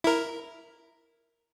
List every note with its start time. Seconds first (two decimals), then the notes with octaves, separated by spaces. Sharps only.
0.04 E4 A#4